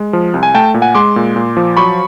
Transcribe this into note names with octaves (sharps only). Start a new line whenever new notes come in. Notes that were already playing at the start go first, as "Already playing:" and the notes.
Already playing: G#3
F3
C2
G#5
A3 G5 A5
A#2
F#5 G#5
G#3 C6 D6
A#2
A#2
F3
F#3 B5 C#6